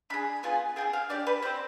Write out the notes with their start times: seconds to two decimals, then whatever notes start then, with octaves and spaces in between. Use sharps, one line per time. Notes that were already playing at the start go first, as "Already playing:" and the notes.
0.10 D4 G#4 B5
0.43 B3 F4 G#4 G#5
0.76 C4 F4 G#4 G5
0.93 F5
1.09 D4 G4 D5
1.27 B4
1.42 C4 G4 C5